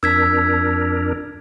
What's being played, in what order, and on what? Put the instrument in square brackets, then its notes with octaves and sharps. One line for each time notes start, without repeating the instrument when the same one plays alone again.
[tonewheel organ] F2 D4 A#4 [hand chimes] E6 G#6 B6